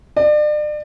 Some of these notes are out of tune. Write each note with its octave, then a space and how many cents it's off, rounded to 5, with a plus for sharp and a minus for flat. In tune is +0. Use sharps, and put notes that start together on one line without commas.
D5 +35